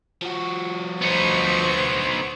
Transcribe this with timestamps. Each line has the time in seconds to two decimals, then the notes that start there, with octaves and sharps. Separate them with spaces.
0.22 F3 F#4
1.02 D2 B3 D#4 C5 C#6